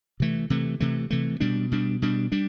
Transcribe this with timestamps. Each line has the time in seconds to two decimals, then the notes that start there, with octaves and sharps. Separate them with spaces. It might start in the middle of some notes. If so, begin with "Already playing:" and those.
0.20 C3 E3 A3
0.50 C3 E3 A3
0.80 C3 E3 A3
1.10 C3 E3 A3
1.40 B2 G3 D4
1.71 B2 G3 D4
2.02 B2 G3 D4
2.32 G3 D4